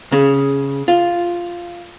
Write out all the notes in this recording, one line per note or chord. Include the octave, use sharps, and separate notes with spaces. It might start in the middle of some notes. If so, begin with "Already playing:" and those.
C#3
F4